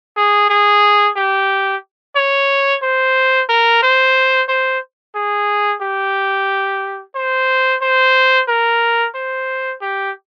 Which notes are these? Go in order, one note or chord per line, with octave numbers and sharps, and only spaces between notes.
G#4
G#4
G4
C#5
C5
A#4
C5
C5
G#4
G4
C5
C5
A#4
C5
G4